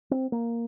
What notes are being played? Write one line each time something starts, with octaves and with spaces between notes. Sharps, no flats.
C4
A#3